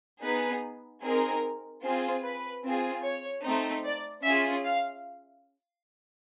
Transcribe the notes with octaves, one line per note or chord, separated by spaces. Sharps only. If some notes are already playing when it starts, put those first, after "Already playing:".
B3 D#4 G#4 B4
C4 D#4 G#4 A#4
C4 F4 G#4
B4
C4 F4 G#4
C#5
A3 C4 D#4
D5
C#4 F4 G#4 E5
F5